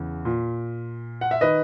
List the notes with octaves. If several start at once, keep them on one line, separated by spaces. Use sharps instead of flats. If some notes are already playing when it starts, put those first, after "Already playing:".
Already playing: E2 C#3 E3
A#2
F#5
E5
D#3 B4 D#5